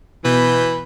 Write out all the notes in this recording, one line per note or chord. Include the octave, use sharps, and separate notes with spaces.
B2 E3 B4 G6